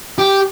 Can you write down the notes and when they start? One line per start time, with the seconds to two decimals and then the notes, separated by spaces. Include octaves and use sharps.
0.18 G4